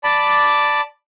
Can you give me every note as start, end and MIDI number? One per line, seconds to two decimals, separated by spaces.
0.04 0.81 74
0.04 0.81 81
0.04 0.81 83
0.04 0.81 86